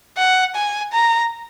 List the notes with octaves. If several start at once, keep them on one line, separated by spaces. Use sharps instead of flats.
F#5
G#5
A#5